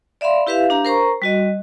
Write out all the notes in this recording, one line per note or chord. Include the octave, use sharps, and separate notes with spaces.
D5 E5 F5 B5 C6
E4 G4 B4 E5 F5
D4 G4 F5 A#5
A#4 C5 A#5 C#6
G3 F#4 D#5